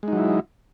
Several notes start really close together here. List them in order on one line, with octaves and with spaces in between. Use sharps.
G#3 D#4 F#3 E4